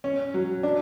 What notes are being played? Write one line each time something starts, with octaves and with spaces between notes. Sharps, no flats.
C#4
F#3
D4